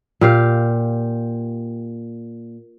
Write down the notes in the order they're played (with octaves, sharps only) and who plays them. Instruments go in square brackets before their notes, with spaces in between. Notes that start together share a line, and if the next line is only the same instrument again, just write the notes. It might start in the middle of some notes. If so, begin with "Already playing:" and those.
[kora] A#2 G4 F5